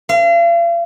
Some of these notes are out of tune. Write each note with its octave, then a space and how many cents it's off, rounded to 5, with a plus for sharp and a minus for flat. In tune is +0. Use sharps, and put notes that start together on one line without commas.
F5 -40